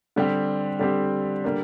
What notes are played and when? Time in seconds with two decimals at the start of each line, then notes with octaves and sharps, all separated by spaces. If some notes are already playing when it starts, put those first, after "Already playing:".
0.16 D3 G3 C4 G4
0.79 D3 G3 C4 G4
1.44 D3 G3 A#3 D4